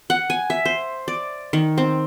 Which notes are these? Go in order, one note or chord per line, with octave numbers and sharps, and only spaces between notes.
F#5
G#5
E5
C5
D5
D#3
C4